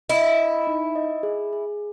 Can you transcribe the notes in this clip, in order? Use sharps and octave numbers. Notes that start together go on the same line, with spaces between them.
E4 D#5
D#5
D#4
D#5
G#4
G#4